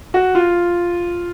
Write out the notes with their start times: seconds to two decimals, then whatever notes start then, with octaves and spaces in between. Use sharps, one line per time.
0.14 F#4
0.35 F4